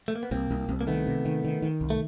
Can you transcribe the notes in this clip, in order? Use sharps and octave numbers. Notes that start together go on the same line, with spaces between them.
A3
A#3
B3
C2 A#3 C4
C2
C2
A#3
D#3 A3 B3
C3
D#3
D#3
D#3
C2
A3